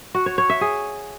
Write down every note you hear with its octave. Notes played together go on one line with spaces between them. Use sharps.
F#4
C#5
C#5
E5
G#4